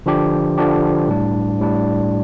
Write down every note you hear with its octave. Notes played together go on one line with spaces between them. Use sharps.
D3 F3 D4 G4
D3 F3 D4 G4
A2 G3 D4
A2 G3 D4